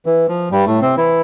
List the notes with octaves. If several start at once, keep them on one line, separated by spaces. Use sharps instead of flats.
E3
F3
G2 G3
A2 A3
C3 C4
E3 E4